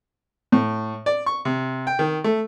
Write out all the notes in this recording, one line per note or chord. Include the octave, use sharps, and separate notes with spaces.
A2
D5
C#6
C3
G5
D#3
A3